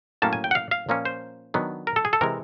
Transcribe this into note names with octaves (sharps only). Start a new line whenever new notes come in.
A2 F#3 A#3 C#4 A5
G#5
G5
F#5
F5
F5
A#2 F3 A#3 C#4
C5
D#3 F#3 B3 D4
A#4
A4
G#4
A4
C3 E3 G#3 A#4